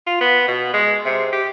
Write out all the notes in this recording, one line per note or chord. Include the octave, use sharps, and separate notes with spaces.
F4
B3
B2
G#3
C3
G4